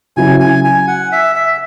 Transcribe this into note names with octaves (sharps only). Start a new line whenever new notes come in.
C#3 F#3 E4 G#5
G#5
G#5
F#5
E5
E5